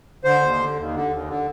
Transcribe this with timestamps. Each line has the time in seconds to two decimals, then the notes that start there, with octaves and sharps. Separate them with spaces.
0.24 D3 C5
0.42 D#2
0.59 D3
0.76 D#2
0.93 D3
1.09 D#2
1.27 D3